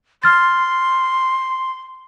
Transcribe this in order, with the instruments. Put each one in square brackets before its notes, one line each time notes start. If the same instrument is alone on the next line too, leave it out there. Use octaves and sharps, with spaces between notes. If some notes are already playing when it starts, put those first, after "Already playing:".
[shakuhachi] C6 [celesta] F6 A6